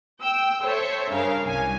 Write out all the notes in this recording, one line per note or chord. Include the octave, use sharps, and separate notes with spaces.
G5 E6
A4 C5 C#5 E5
G2 C#3 A#4 F5
C2 G#5